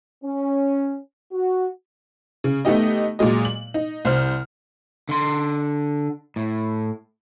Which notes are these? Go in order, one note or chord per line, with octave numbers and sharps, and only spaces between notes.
C#4
F#4
C#3
A3 B3 D#4 G4 D#5
A#2 F#3 G#3 D#5
F#7
D#4
C2 C5 F6
D3 C6
A2